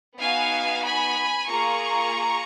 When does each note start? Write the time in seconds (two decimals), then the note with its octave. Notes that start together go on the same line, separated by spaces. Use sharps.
0.18 B3 D#4 F#4 F5 G#5
0.83 G#5 B5
1.48 A#3 F4 G#4 A#5 C#6